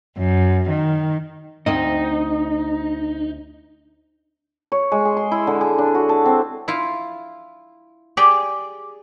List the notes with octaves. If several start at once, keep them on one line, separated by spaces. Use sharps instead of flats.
F#2
D#3
D2 C4 D#4 D#5
C#5
G#3
G#4
C6
E4
D3
G#4
D4
F#4
A5
C4
E4 F4
G4 G#4 D5 G5